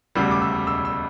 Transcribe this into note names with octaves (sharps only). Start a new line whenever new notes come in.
E1 D2 C#3 G3 E6
D6
E6
E6
E6